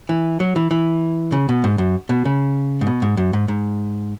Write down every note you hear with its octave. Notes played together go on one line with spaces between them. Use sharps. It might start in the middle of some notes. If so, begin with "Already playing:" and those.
E3
F#3
E3
E3
C#3
B2
G#2
F#2
B2
C#3
G#2
B2
G#2
F#2
G#2
G#2